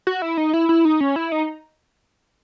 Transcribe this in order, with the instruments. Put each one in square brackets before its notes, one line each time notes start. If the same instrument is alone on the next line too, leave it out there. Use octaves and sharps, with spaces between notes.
[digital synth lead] F#4
E4
D#4
E4
E4
D#4
C#4
E4
D#4